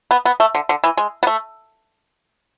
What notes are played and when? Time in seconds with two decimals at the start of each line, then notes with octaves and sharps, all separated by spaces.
0.11 B3
0.25 B3
0.40 A3
0.55 D3
0.69 D3
0.84 E3
0.97 G#3
1.23 B3
1.27 A3